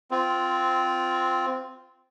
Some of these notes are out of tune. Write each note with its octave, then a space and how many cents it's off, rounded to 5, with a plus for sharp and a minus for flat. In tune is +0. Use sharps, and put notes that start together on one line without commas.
C4 -10 F4 +0